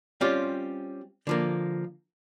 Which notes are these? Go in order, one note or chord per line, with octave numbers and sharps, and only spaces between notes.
G3 C4 C#4 F4 G4
D3 F3 A#3